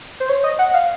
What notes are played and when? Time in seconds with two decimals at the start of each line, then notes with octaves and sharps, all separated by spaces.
0.20 C5
0.29 C#5
0.44 D#5
0.59 F#5
0.74 F5